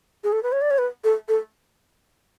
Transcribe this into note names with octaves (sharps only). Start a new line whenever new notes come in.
G#4
A4
B4
C#5
D5
C#5
B4
A4
A4